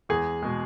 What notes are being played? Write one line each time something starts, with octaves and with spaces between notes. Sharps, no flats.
E2 G#4
B2 G#3